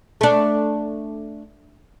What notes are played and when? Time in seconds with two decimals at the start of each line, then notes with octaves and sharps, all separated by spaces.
0.21 A3 D4